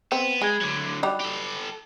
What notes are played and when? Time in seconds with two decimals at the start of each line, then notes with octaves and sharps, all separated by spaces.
0.12 B3 C4
0.41 G#3 G#4 B5 G#6
0.61 D3 F#3
1.03 F#3 G3 D#4 B5 D6 F#6
1.21 G4 A4